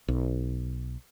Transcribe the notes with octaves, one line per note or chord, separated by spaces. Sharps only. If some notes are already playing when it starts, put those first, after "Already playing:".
B1